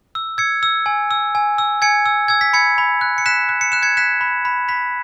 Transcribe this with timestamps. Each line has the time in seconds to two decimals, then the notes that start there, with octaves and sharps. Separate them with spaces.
0.15 E6
0.38 E6 G#6 C#7
0.63 E6
0.86 G#5
1.11 E6
1.35 G#5
1.58 E6
1.82 G#5 G#6 C#7
2.06 E6
2.28 E6 G#6
2.41 B6
2.53 B5 G#6 C#7
2.78 B5
3.01 F#6
3.18 C#7
3.26 F#6 B6 E7
3.49 F#6
3.61 C#7
3.72 F#6 E7
3.82 G#6 C#7
3.97 F#6 B6 E7
4.21 B5
4.45 B5
4.68 B5 B6